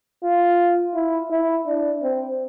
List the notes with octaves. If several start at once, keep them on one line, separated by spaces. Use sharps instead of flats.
F4
E4
E4
D4
C4